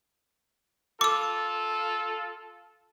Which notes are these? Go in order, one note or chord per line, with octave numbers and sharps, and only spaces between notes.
F4 A4 D6 E6